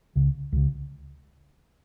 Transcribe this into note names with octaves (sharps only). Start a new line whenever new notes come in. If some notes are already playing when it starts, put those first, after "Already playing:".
C#2 C#3
C#2 C#3